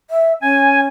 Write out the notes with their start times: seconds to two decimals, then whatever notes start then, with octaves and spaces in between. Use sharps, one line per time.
0.10 E5
0.41 C#4 G#5